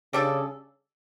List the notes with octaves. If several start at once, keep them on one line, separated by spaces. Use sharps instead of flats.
C#3 G3 D4 A4